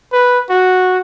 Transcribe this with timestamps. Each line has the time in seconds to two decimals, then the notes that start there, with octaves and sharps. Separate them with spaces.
0.13 B4
0.50 F#4